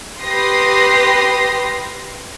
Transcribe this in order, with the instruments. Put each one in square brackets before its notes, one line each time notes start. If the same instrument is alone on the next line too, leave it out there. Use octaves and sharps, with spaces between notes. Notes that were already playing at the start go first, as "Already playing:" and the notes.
[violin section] G4 B4 C6 D#6 A#6 C7